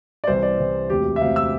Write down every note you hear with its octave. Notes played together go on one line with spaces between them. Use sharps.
D5
C2 C3 E3 C5
D5
C2 C3 E3
E1 D2 C3 G4
E5
E1 D2 C3 F5
E6